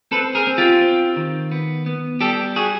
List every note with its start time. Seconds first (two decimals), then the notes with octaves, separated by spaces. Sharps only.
0.11 C4 A4 B4
0.35 G#4 A#4
0.47 C4
0.58 F4 G4
0.81 C4
1.16 D#3
1.52 B3
1.86 B3
2.21 G3 G4 A4
2.56 F#4 G#4